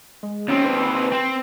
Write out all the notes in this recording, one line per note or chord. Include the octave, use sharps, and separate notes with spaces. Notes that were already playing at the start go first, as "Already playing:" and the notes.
G#3
D#2 C4 C#4
B4
C4